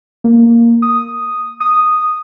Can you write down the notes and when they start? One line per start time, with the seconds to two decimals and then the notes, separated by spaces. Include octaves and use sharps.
0.24 A#3
0.82 D#6
1.60 D#6